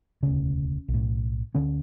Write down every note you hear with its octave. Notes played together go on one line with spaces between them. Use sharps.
E1 D2 C#3 C#4
B1
A2
D2 D3 C#4